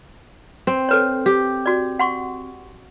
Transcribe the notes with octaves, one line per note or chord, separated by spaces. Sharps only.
C4
A4 B4 C#5
G4
F#4 D5
F#5 C6 C#6